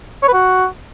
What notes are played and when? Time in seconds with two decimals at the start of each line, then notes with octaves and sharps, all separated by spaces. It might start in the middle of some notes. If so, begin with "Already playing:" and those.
0.23 C#5
0.28 B4
0.33 F#4